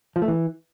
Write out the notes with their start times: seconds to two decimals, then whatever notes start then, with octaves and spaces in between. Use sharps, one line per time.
0.16 F3
0.22 A3
0.28 E3